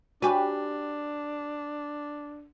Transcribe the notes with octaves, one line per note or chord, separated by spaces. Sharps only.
D4 F#4 G4 B4 G#5 C#6